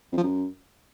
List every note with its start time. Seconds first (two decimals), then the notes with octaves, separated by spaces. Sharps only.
0.12 F2
0.18 F3
0.23 F#2